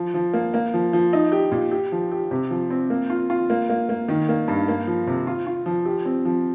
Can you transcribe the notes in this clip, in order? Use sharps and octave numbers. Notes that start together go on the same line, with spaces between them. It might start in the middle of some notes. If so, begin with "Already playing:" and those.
Already playing: F3
F3
A#3
A#3
F3
F3
D#4
G4
A#2
G4
F3
G4
C3
F3
C4
A#3
F4
F4
A#3
A#3
A#3
D#3
A#3
G2
A#3
F3
C3
F4
F4
F3
G4
C4
F3